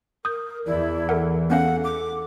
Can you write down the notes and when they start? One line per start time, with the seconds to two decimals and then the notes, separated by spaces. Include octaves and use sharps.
0.25 A#4 D#6 G6
0.66 E2 E3 E4 D5
1.09 A4 A#4 F#5
1.50 B3 C#4 A4 F5 F#5
1.84 D6